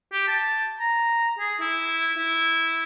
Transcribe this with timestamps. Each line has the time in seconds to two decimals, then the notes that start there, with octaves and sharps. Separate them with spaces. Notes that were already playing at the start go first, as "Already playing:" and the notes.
0.12 G4
0.28 A5
0.79 A#5
1.39 G#4
1.60 E4
2.17 E4